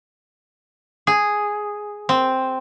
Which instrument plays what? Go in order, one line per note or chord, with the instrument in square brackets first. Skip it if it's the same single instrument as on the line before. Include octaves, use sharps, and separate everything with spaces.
[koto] G#4
C4